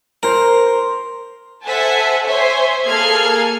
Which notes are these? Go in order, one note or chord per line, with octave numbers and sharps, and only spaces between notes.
A#4 C5 A#5
A4 C5 E5 F#5 G#5 A5
C5 C#5 E5 G#5 C6
A#3 G#4 A4 F6 G#6 C7